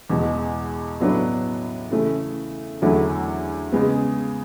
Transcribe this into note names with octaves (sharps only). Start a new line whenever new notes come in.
E2 B2 G#3
A2 F#3 B3 D4
C#3 E3 A3
E2 D3 F#3 A3 E4
C#3 G#3 B3